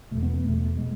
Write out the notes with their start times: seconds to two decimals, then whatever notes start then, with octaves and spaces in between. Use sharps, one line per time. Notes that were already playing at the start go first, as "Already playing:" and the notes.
0.11 E2 B2 A3
0.23 B3
0.34 B3
0.44 E2 B2 A3
0.78 B2 G#3